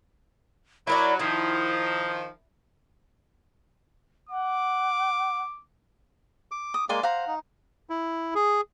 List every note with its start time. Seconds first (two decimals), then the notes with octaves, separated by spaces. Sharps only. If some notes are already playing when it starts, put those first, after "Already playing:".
0.87 F#3 E4 A#4 D5 B5
1.20 D#3 F3 E4 D#6
4.29 F#5 D6
6.51 D6
6.74 D#6
6.89 G#3 A#3 D5 G#5 C6
7.03 C5 F5 F#5 A#5
7.27 D#4
7.90 E4
8.35 G#4